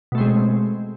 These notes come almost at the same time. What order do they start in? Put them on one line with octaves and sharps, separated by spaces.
B2 A3 C4 G#3